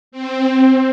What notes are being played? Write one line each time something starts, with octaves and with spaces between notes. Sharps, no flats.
C4